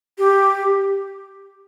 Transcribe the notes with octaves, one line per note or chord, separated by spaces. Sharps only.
G4